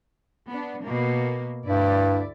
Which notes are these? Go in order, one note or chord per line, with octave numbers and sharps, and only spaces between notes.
B3 D4
B2 A#3
D2 G2 E4 D5